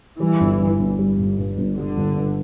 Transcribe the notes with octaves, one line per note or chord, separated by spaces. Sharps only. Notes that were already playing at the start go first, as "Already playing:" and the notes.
E3 G3
G1
G2
G1
G3
G1
G2
G1
D3 G3
G1
G2